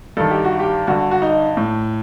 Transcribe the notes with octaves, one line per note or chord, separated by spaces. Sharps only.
G2 D#3 A4
G4
F#4
G4
G2 D3 F#4
F#4
D#4
A2